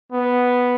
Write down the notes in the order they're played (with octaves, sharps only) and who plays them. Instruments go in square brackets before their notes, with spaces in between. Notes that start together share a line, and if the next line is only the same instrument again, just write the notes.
[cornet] B3